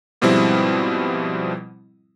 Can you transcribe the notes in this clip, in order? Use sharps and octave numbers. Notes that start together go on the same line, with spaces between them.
G#2 B2 F3 G3 C4 E4